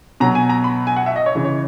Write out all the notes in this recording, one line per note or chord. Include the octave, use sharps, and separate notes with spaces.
B2 F#3 A#5
G#5
A#5
B5
G#5
F#5
E5
D#5
C#5
C#3 E3
C#5